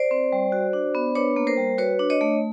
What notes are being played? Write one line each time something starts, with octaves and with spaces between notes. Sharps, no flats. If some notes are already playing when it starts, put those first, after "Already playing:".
Already playing: C5 D5
C4
G3
F#4
D4
B3
D4 B4 C#5
A#3
A#4 C5
G3
F#4 B4 C#5
D4
C#5 D#5
A3